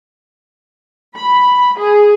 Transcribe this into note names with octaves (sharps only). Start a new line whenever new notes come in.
B5
G#4